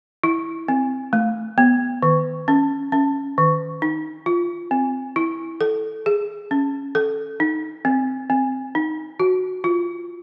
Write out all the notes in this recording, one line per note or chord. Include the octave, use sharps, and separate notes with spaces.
E4
C4
A3
B3
D#3
C#4
C#4
D#3
D#4
F4
C4
E4
A4
G#4
C#4
A4
D#4
C4
C4
D#4
F#4
F4